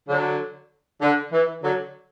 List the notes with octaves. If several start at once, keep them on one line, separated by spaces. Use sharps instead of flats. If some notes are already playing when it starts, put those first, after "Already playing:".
D3 F#3
D3
E3
D3 F#3